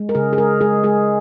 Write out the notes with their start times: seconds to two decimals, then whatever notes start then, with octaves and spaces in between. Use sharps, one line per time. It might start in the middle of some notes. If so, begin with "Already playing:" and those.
Already playing: G#3
0.09 A#4
0.15 C#3 G#4
0.33 G#4
0.38 G#3 A#4
0.61 G#3 G#4
0.84 G#3 G#4